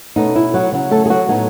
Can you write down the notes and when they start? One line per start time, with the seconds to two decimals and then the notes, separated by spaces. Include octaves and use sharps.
0.16 B2 A3 C#4 D#4
0.36 E4
0.54 F#3 F#4
0.72 C#3 F#3 C#4
0.91 A3 A4
1.06 G#4
1.10 F#3 F#4
1.29 A2 F#3 B3 D#4